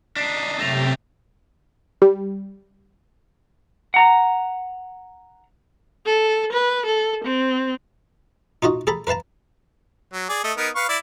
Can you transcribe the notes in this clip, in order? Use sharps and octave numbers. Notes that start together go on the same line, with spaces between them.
D4 D#4 B6 C7
F#2 C3 A3 G4 A6 A#6 F7
G3
F#5 A#5
A4
B4
A4
C4
D#4 F4 F#4 D#5
G#4 A4 A#5 B5
A#4 B4 F5 A5 A#5
F#3
G#4 D5
A3 D#5
B3 D#4 A#4
B4 F5 C#6
E4 D5